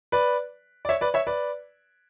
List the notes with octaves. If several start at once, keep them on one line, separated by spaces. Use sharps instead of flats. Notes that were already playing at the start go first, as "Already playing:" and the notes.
B4 D5
D5
C#5 E5
B4 D5
C#5 E5
B4 D5